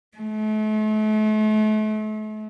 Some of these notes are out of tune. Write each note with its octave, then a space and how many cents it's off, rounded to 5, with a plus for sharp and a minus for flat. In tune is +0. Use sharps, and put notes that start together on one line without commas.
A3 -40